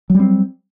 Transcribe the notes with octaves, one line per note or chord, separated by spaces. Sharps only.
F#3 G3 C4